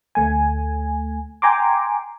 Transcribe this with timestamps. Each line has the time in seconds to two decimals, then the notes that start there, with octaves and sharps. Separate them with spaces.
0.15 D2 A3 G#5
1.42 G5 G#5 A#5 C6 D6